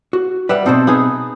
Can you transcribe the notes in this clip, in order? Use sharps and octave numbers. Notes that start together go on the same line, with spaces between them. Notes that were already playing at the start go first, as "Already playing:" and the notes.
F#4
G3 B4 E5 F#5
B2 C4 D#4 A4 C5
B3 D#4 G#4